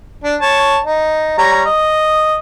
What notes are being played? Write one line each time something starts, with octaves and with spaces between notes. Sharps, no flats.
D4
C#5 A5
D#4
G3 C#5 A#5
D#5